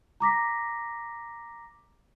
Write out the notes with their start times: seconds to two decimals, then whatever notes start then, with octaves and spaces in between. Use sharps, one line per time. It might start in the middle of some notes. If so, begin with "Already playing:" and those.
0.20 A#5 D6 A#6 B6